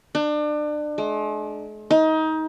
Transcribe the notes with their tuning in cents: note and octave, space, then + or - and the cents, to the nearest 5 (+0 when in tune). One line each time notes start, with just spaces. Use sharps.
D4 +30
G#3 +45
D#4 +25